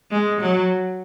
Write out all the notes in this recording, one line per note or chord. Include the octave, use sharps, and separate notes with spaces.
G#3
F#3